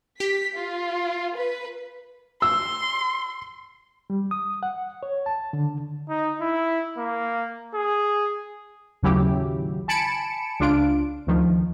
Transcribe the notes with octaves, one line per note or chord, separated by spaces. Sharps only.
G4 B6
F4
B4
C6 E6
G3
D#6
F#5
C#5
A5
D3
D#4
E4
A#3
G#4
A1 D#2 C#3 F#3 E4 G4
G#5 A5 B5 C#7 D7 E7
C#2 D4 F4 D7
D2 D#3 F3